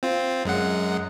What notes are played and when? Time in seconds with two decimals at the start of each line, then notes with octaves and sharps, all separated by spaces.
0.03 C4 F4
0.45 F#2 G#3 F#5